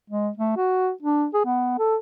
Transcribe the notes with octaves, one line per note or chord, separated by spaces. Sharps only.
G#3
A3
F#4
D4
G#4
B3
A4